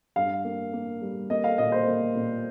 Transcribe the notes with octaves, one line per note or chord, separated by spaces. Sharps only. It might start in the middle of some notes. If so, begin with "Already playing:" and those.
G2 F5
A#3
A#3
G3
A#3 D#5
F5
A#2 D#5
C5
A#3
A#2